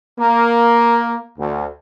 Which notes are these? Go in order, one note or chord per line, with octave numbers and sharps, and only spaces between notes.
A#3
D2